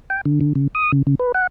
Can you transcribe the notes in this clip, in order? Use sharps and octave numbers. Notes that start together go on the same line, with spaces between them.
G5
D3
D3
C#3
D#6
C#3
C#3
B4
F#5